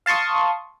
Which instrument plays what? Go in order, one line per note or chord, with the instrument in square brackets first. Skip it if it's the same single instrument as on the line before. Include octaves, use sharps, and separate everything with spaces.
[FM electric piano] F5 A5 C6 C#6 D#6